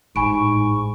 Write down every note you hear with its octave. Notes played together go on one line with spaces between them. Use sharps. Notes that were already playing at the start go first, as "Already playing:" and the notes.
A1 G#2 G#5 B5 C#6 D7